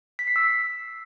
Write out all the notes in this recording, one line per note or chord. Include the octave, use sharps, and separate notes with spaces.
B6
C7
E6